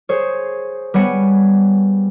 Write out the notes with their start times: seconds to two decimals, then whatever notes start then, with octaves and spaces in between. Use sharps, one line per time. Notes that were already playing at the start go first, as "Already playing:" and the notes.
0.09 G#4 C5 C#5
0.94 G3 B3 C#5 G#5 C#7 D7